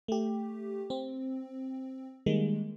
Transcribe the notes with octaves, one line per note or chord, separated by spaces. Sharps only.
A3 G4
C4
D#3 G3 G#3 A#3